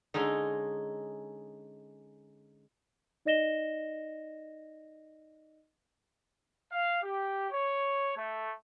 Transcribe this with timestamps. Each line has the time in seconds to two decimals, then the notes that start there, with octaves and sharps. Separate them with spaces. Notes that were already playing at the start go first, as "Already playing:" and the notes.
0.14 D3 G#3 C#4 D#4
3.25 D#4 D5 D#5 A#6 E7 G7
6.70 F5
7.01 G4
7.50 C#5
8.15 A3